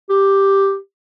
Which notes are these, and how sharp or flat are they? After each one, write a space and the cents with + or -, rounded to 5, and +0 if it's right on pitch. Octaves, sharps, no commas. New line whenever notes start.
G4 +0